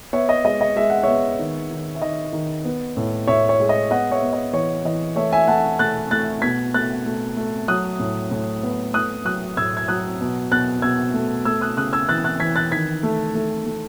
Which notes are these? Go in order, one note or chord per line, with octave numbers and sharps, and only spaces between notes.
B3 C#5 E5
D#5
G#3 D#5
D#5
G#3 E5
F#5
B3 C#5 E5
D#3
D#3
E5
D#3 D#5
D#3
B3
A2
A2 C#5 E5
C#5
G#3
D#5
B3 D#5 F#5
C#5 E5
B3
D#5
E3 C#5
E3 D#5
A3 C#5 E5
E5 G#5
A3 F#5 A5
A3 F#6 A6
A3 F#6 A6
B2 G#6 B6
A3 F#6 A6
A3
A3
F#3 D#6 F#6
A2
A2
B3
A3 D#6 F#6
F#3 D#6 F#6
A2 E6 G#6
G#6
F#3 D#6 F#6
B2
B2 F#6 A6
B2 E6 G#6
A3
A3 E6 G#6
D#6 F#6
C#3 D#6 F#6
E6 G#6
E3 F#6 A6
F#6 A6
E3 G#6 B6
F#6 A6
D#3 G#6 B6
A3
A3
A3